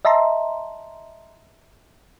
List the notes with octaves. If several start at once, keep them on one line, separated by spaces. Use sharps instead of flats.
D#5 E5 A5 A#5 C6